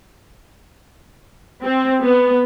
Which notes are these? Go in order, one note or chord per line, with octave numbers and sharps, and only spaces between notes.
C4
B3